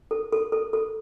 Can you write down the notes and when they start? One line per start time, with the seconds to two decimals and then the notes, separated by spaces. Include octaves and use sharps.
0.11 A4
0.33 A4
0.52 A4
0.73 A4